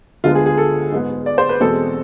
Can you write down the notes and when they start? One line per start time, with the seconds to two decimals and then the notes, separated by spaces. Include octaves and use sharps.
0.24 D2 D3 G#3 B3 F4
0.35 G#4
0.46 G#4
0.58 A4
0.92 G#2 G#3 B3
1.26 D5
1.38 C5
1.49 B4
1.61 E2 B2 G#3 C4 A4